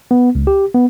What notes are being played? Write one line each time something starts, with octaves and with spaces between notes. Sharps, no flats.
B3
C#2
G4
B3